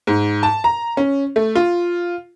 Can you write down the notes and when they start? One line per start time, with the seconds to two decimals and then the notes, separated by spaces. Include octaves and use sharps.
0.07 G#2
0.43 A5
0.64 A#5
0.97 C#4
1.36 A3
1.55 F4